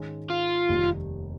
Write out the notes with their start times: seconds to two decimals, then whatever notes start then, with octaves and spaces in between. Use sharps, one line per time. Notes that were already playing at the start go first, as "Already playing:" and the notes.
Already playing: G#2 D#3 G#3 C#4
0.30 F4
0.69 F1 D#2 D#3 G3